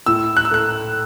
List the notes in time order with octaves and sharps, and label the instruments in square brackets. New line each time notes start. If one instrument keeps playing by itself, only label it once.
[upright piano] A2 [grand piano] E6
[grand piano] F#6
E6
[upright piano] A3 [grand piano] F#6